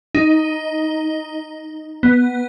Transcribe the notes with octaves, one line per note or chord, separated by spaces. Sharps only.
D#4
B3